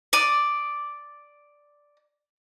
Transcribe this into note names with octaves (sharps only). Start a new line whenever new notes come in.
D5 D#6